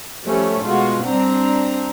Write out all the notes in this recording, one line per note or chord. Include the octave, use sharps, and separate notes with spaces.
F3 G3 A3 C#4
B2 G#3 F4 F#4
G3 C4 D4 A#5